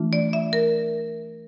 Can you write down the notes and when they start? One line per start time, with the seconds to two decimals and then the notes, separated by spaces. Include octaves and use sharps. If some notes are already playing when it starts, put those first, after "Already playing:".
Already playing: E3 A3 D4 F4
0.13 D5
0.33 E5
0.53 A#4